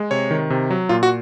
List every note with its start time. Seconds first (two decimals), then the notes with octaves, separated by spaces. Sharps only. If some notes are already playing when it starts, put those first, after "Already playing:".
Already playing: G#3
0.11 C3 C#5
0.31 D#3
0.50 C3
0.70 F#3
0.89 A#2 F4
1.03 F#4